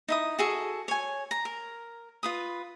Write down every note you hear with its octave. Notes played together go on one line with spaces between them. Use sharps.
D#4 E4 D#6
F#4 G#4 A4
C#5 G#5
A#5
A#4
F4 B4 D#6